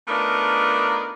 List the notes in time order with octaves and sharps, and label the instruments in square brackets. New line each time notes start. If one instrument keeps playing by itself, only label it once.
[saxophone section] A3 B3 D4 D#4 F4 A#4